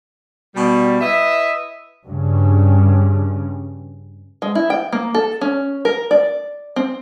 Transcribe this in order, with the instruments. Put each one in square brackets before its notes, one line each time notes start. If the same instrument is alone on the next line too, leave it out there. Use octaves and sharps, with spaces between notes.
[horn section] B2 G3
E4 B4 D#5 E5
[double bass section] G2 C#3
[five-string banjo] G#3
E4
G5
A#3
A4
C#4
A#4
D5
C4